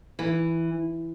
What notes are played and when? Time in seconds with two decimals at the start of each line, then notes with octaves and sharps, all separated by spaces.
0.19 E3